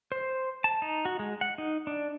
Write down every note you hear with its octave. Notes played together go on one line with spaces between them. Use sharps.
C5
A5
D#4
F#4
G#3
F#5
D#4
D4